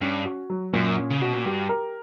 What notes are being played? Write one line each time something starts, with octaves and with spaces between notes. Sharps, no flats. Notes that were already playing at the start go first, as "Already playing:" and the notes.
G2 C#4
F#4
F#3
F#2 A#2
C#4
C#3
B2 F#4
A#2
G2 G4
A#4